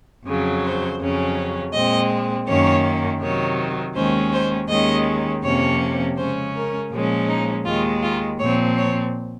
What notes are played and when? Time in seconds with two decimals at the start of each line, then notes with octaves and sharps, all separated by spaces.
0.25 F2 C#3 F#3
0.62 C5
0.99 F2 C#3 F#3 C#4
1.73 A#2 G#3 C4 D#5
2.47 F#2 D#3 A#3 C#4 C#5
3.21 C3 D#3 F#3 C#5
3.95 D#2 D#3 G#3 C#4 C5
4.32 C5
4.69 D#2 D#3 G#3 C#4 D#5
5.43 F2 C3 F3 A#3 C#4 C#5
6.17 C#3 G#3 C#4 C5
6.54 A#4
6.91 A#2 F3 G#3 C#4
7.28 D#4
7.65 D#2 D#3 G#3 F4
8.02 F4
8.39 A#2 F3 C4 C#5
8.77 C#5